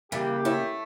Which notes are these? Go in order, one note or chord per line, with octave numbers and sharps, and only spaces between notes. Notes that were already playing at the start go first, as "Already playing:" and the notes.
C#3 E3 G3 A#3 G4
A3 E4 C#5